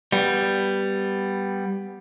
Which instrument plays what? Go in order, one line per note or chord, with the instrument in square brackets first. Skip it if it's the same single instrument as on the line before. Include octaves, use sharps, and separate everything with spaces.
[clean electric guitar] G3 B3